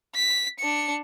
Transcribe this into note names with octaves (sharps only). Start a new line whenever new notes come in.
B6
D4 C#7